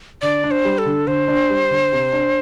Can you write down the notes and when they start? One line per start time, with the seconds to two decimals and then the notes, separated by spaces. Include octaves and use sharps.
0.22 D3 D5
0.44 D4
0.51 C5
0.65 G3
0.78 A4
0.86 D3
1.07 D3 C5
1.28 D4
1.50 G3
1.71 D3
1.92 C3
2.13 D4